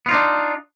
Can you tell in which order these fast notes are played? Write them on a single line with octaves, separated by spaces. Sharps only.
B3 F4 D#4 D4